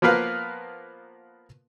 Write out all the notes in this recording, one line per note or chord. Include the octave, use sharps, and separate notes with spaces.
F3 A#3 B3 A#4 B4 F5